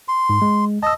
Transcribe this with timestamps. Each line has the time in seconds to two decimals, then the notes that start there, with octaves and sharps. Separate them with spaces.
0.08 C6
0.29 G#2
0.42 G#3
0.83 D#5 A5 E6